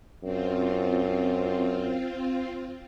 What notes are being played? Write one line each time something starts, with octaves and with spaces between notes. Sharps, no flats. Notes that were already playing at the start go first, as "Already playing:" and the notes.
F#2 C4 F4